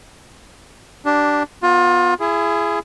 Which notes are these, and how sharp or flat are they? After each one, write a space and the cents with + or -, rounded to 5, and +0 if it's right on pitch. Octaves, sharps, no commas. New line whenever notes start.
D4 +0 G4 -20
B3 +0 F4 +30
E4 +35 G#4 +0